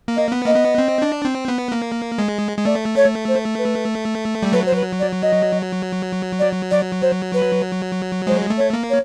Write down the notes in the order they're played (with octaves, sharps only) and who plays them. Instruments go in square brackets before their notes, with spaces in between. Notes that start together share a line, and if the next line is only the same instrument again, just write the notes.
[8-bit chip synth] A#3
[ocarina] D#5
[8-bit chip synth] B3
[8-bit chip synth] A#3 [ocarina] D#5
[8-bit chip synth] B3
C4
D4
C4
B3
A#3
G#3
G#3
[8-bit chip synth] A3 [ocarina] D5
[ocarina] C#5
C5
B4
[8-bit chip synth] G3
[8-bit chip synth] F#3 [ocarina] B4
[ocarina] C5
B4
D5
D#5
D5
D5
C5
B4
[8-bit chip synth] G#3 [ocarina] C5
[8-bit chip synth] A3
[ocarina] C#5
[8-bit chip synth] A#3
[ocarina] C#5